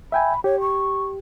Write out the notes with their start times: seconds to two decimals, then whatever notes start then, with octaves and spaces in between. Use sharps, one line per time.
0.12 E5 G5 G#5 B5
0.44 G4 C#5
0.61 C#6